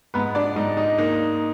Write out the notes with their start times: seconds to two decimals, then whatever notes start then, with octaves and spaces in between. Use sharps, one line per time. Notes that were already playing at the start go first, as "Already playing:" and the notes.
0.14 G#2 B3 B4
0.35 D4 D5
0.56 G#2 D#4 D#5
0.77 D#4 D#5
0.98 A#3 D#4 D#5